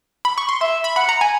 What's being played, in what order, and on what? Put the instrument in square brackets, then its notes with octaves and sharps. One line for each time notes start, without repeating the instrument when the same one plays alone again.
[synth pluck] B5
C#6
C6
[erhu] E5 [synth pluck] C6
[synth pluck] B5
[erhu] F#5 [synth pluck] B5
[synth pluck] A#5
G#5